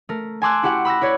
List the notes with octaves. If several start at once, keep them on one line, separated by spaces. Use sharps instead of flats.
A3 A#4
G#5 A5 C6 D6 E6 F#6
E4 F#4 G4 F#5
B5 E6 F#6 A#6
E4 B4 C#5 D5